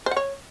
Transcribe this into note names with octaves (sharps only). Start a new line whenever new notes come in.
C5
F#5
C#5